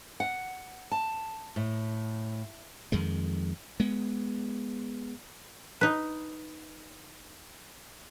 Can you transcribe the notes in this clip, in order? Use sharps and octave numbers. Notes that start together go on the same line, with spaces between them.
F#5
A5
A2
F2 D#3 G#3
G#3 B3
D#4 B4